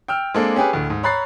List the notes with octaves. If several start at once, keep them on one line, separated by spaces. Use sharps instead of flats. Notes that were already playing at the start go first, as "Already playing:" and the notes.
G5 E6 F6
G#3 A#3 C4 D4 A4
C#4 G4 G#4 B4
D2 A2
G#2
C#5 A#5 B5 F#6 A6 C7